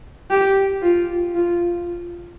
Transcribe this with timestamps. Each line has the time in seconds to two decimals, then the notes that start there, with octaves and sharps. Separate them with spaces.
0.31 G4
0.82 F4
1.35 F4